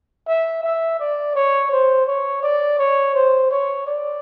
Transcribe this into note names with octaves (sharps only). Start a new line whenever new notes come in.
E5
E5
D5
C#5
C5
C#5
D5
C#5
C5
C#5
D5